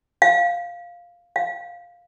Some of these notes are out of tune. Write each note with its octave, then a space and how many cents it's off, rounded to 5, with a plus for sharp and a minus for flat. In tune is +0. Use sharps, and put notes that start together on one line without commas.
F5 +0
F5 +5